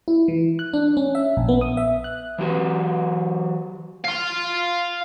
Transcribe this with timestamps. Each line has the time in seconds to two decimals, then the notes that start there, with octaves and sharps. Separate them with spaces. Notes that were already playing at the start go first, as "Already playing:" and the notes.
0.08 E4
0.28 E3
0.59 F#6
0.74 D4
0.97 C#4
1.15 E5
1.37 A#1
1.49 B3
1.61 D#6
1.77 E5
2.04 F#6
2.38 E3 F#3 G4 B4
4.05 F5 C6